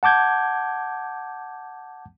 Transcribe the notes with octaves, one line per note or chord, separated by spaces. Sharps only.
F#5 A5 D6 G6 G#6